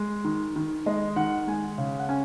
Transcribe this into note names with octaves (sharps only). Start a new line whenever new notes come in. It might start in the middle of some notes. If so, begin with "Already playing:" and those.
Already playing: G#3
D#3
D#3
G#3 D#5
D#3 F#5
G#3 G#5
C#3
F#5
C#4 G#5